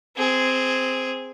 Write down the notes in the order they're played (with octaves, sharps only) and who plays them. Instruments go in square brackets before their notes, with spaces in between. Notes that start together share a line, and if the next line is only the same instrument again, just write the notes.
[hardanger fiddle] C4 G#4